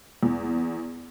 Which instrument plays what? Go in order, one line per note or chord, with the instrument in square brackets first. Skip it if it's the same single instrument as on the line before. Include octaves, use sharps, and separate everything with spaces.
[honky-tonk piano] E2